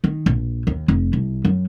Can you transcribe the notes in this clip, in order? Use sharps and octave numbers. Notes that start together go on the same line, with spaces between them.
D#3
A#1
D#2
F1
C2
F#2